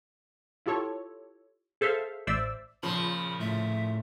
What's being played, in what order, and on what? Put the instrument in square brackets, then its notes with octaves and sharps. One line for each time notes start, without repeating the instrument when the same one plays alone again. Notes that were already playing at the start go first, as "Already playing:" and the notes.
[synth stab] E4 F4 G4 A4 C#5
G#4 A4 C5 E5 F5
A1 C5 D5 E5 E6
[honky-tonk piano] A#2 C#3 [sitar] F3 [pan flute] B5
[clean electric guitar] A2 [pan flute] E5